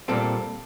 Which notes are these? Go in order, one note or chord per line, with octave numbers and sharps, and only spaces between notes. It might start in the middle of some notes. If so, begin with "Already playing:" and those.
A#2 G3 C4 A4